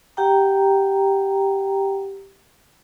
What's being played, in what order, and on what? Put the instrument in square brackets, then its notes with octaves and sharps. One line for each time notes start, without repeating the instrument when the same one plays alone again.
[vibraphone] G4 F#5 G5 A#5